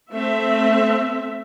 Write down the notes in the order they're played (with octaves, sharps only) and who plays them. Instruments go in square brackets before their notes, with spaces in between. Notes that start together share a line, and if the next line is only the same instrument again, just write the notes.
[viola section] A3 C4 E5